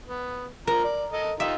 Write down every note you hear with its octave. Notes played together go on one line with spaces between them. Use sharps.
B3
F3 A#3 A#4 A#5
D5
A4 D#5
D#4 F4 G4 E5